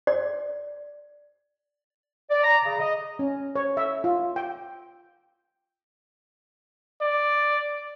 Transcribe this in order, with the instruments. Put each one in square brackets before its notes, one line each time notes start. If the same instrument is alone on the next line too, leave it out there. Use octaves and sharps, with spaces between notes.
[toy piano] D5
[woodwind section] D5
A#5
C#3
D#5
[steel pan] C#4
C#5
E5
F4
G5
[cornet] D5